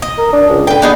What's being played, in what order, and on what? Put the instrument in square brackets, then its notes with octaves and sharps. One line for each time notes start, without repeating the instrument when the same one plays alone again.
[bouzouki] D#5
[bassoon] A#4
D4
C#2
[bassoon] D3 [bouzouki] B4 G5
[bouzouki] B3 D#4 G#4 [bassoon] D4